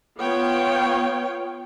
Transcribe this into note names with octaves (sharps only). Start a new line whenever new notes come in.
B3 F4 C#5 G5